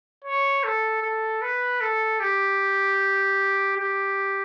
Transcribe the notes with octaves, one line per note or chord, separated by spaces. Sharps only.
C#5
A4
A4
B4
A4
G4
G4